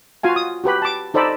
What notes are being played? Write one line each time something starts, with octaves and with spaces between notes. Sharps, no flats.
F4 F#4 F5 G#5
D#6
F#4 G4 B4 B5
A5 D6
D#4 A4 C5 D5 B5